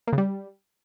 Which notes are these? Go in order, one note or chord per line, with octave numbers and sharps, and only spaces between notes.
A#3
C#3
G3